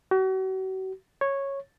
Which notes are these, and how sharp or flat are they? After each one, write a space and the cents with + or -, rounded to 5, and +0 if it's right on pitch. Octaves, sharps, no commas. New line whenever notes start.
F#4 +40
C#5 -10